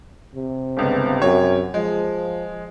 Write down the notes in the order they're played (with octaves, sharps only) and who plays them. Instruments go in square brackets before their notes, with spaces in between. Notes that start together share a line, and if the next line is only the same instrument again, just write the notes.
[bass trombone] C3
[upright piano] G1 C#2 B3
[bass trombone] F#2 [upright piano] C3 C#5
[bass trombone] F3 [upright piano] G#3